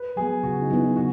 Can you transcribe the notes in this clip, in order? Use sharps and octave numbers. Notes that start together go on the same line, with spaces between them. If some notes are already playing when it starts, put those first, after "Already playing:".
Already playing: B4
F#3 B3 G#4
C#3 F#4
D#4
F#3 B3 E4
E4
C#3 F#4